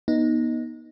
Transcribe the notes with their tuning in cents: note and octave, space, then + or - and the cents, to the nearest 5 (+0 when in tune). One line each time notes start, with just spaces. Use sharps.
B3 -30 D#4 +0